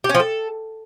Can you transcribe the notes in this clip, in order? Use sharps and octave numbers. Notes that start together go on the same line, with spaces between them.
G4
C#4
F3
A4